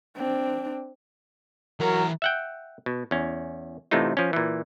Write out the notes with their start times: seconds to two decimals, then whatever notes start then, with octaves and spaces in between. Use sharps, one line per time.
0.17 C4 D4
1.80 E3 F#3 A#4 A#5
2.22 E5 F#5 G5
2.86 B2
3.11 E2 C#4
3.91 A1 A2 C3 A3 D#4 F4
4.17 F3 C#4
4.33 A#2 E3